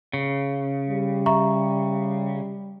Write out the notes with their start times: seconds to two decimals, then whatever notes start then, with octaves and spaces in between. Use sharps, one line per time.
0.13 C#3
0.88 G3
1.26 E5 A#5 C#6